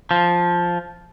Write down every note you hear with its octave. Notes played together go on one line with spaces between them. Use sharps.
F3